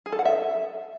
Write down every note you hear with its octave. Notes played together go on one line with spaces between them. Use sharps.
G#4
A4
F#5
E5